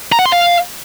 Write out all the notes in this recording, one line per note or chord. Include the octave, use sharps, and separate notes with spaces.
A#5
F#5
C6
F5